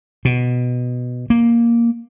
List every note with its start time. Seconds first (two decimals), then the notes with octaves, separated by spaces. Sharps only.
0.25 B2
1.30 A#3